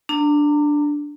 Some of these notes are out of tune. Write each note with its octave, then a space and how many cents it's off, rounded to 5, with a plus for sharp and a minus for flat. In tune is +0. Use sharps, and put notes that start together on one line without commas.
D4 +0 A#5 -35